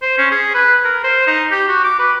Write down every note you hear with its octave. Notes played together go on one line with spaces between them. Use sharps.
C5
C#4
G#4
B4
A#4
C5
D#4
G4
F#4
D6
B4